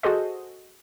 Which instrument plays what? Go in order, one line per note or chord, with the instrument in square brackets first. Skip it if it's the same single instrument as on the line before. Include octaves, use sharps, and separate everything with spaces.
[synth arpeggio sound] F#4 G#4 A4 C5 D#5